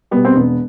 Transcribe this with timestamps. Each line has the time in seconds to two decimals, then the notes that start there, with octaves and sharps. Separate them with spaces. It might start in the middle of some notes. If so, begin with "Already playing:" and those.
0.11 B2 G3 B3
0.25 C4
0.36 E1 B3